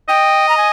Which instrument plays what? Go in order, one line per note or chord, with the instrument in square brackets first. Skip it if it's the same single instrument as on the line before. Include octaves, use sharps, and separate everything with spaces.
[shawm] D#5 [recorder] G5
[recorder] A#5
G#5